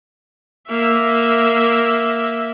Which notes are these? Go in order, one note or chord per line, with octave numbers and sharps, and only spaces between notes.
A#3 E5